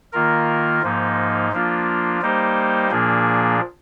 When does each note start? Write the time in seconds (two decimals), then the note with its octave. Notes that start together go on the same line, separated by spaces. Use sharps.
0.13 D#3 A#3 F4 A#4
0.83 G#2 F3 A#3 D#4
1.52 F3 A#3 D4 F4
2.22 G3 A#3 D#4 G4 C5
2.91 A#2 F3 A#3 D4 G#4